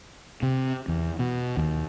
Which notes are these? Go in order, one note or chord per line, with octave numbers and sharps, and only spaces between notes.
C3
E2
B2
D#2